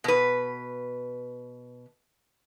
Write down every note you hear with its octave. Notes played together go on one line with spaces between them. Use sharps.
B2 B4